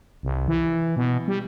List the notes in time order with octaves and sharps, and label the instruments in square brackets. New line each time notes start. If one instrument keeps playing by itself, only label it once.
[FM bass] C2
E3
B2
G3